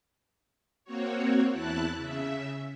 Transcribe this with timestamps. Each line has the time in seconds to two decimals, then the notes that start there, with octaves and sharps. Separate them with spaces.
0.85 A#3 C4 F#4 C#5
1.53 E2 E4 A5 F#6
1.96 C#3 E5